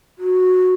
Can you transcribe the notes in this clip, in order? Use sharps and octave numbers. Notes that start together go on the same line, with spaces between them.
F#4